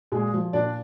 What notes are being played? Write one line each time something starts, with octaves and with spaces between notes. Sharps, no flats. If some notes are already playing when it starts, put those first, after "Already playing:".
A#2 G#3 G#4
F3
A#2 D4 D5